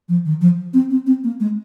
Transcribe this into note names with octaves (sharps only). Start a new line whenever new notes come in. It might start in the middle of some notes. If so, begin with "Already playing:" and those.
F3
D#3
F3
C4
C4
C4
A#3
G#3